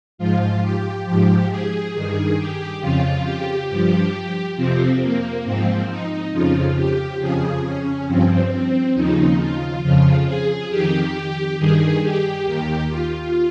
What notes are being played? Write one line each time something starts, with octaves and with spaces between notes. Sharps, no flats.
G#2 F3 F4
G4
G#2 F3 G4
G#4
G2 D#3 G#4
G4
F2 C#3 F3 F4
G4
G2 F3
F2 C3 F3 C4
A#3
G#2 F3 C4
D#4
F2 C#3 F3 F4
G4
F2 C#3 F3 G#4
C#4
G2 F3 C4
C4
D#2 C#3 F3 D#4
F4
F2 C#3 F3 F4
G#4
F2 D#3 G4
G2 D#3 G#4
G4
D#2 D#3
F4